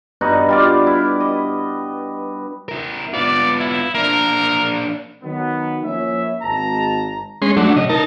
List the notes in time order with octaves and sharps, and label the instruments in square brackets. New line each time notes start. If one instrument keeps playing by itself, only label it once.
[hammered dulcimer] G2 B3 D#4 F#4
G3 F4 D5
E4
D#5
[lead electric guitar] E4 A#4
[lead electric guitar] B3 F4 [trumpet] D5
[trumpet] E4
[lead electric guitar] A#3 D4 [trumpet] A#4
[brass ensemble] D#3 F#3 B3
F3 A#3 C#4 E4 C#5 E5
G#1 G#2 A5 A#5
[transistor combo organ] G#3 C#4 C6
F#3 A3 D4
C#3 D#5
D#4 A#4 A5